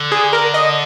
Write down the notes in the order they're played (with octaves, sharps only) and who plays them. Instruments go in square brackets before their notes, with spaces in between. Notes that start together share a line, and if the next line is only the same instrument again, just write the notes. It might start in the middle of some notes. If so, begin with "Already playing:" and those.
Already playing: [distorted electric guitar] D3
[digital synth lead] G#4
A#4
D#5